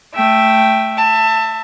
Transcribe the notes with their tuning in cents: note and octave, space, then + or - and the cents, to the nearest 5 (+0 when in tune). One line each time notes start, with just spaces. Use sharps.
A3 +0 E5 +0 G5 +0
E5 +0 A5 +25